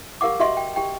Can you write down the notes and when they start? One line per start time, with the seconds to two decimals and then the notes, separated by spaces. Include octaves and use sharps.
0.21 G4 A#4 F5 F#5 D6
0.40 F#4 G4 D#5 E5 F#5 C6
0.57 G5
0.76 G4 G5